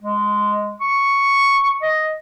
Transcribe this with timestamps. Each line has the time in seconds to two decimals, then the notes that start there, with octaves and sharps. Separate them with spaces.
0.02 G#3
0.81 C#6
1.82 D#5